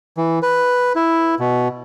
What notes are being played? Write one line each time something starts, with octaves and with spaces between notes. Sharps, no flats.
E3
B4
E4
B2